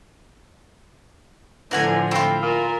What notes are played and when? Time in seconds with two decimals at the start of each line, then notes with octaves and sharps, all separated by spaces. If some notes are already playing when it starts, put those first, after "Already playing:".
1.71 A2 D3 E3 F3 A#4 F#5 G#5
2.11 C4 E4 F4
2.42 A#2 A#4